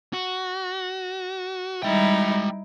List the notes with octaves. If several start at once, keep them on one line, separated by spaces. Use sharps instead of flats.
F#4
G3 G#3 D#4 E4 G5